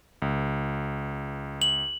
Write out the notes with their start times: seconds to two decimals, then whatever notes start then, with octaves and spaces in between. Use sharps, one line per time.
0.22 C#2
1.62 F#7